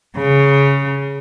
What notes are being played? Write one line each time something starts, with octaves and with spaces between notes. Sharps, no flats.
C#3